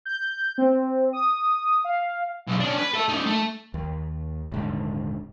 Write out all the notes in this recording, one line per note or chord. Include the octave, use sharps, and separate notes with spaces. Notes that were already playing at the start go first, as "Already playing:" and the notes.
G6
C4
D#6
F5
B1 C#3
C#4 D4
B4
A4 E5
C#4 D#4
A3
D#2
D#1 G#2 D3